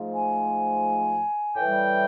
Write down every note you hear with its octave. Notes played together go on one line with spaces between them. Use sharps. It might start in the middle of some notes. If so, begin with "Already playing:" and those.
Already playing: G#2 F3 A3
G#5
A2 E3 G3 G5